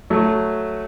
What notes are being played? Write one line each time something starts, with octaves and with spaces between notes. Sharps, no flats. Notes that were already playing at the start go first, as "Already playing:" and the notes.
F#3 A3